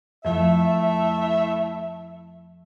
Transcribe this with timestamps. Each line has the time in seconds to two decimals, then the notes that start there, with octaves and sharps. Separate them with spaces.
0.25 F2 F3 A3 E4 E5